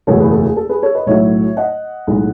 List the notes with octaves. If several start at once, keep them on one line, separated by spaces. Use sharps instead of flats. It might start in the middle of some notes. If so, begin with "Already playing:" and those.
F#1 E2 B2 F#3 A3 A4 C#5
G#4 B4
A4
G#4
A4
G#4 B4
A4 C#5
B4 D#5
B1 A2 F#3 A3 C#5 E5
D#5 F#5
B1 A2 G#3